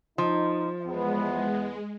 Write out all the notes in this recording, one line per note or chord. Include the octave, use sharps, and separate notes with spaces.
F3 D#4
E2 G#3 B3